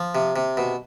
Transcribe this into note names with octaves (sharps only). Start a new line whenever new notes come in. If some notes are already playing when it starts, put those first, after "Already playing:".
Already playing: F3
C3
C3
B2